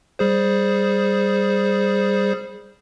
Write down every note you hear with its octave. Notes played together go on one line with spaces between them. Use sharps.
G3 G#4 C5